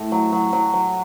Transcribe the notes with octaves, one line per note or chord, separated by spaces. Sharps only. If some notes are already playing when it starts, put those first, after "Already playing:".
Already playing: A2
F#3
F#3
F#3
F#3